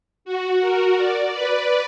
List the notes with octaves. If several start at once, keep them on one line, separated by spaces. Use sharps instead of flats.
F#4
A#4
D5
B4